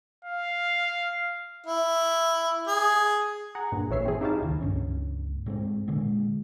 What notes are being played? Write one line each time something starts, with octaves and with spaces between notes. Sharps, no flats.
F5
E4
G#4
G#4 F#5 A#5
G2 A#2
A1 A#2 E3 C#5 E5 C7
C4 G#4
D#4 E4 G4 C#5 F5 A5
D1 D#3
C#2 G2 C#4
A2 G#3 C4
A#2 D3 G#3